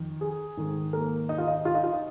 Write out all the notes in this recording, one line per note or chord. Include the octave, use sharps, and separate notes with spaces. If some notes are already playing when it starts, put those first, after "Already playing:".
Already playing: F2 D#3
G#4
G#2 D#3
A#3 A#4
D#4 D#5
F4 F5
D#4 D#5
F4 F5
D#4 D#5
F4 F5
D#4 D#5